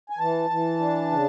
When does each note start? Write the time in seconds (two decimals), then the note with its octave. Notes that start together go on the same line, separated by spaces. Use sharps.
0.10 G#5
0.19 E3 A5
0.50 E3
0.79 D4
1.11 C#3